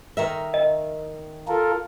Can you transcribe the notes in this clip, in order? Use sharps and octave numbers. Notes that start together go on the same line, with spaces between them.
D#3 A#4 E5
D#5
F4 A4 A#4